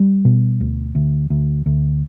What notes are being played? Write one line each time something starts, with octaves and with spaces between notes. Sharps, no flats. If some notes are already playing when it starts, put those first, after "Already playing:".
Already playing: G3
B2
D2
D2
D2
D2